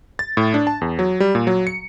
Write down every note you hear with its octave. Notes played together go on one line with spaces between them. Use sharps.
A6
A2
D4
A5
E2
F#3
G3
A#2
F#3
C#7